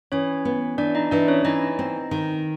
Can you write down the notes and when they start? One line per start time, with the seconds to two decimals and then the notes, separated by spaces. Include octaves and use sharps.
0.12 E3 C#4 C#5
0.45 B3
0.78 E3 D4 D5
0.95 D#4 D#5
1.11 E3 D4 D5
1.28 C#4 C#5
1.45 E3 D#4 D#5
1.79 C4
2.11 D#3